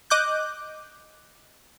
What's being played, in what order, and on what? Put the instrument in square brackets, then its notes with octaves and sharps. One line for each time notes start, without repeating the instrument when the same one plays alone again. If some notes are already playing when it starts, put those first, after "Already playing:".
[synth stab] D#5 D6 F#6 G6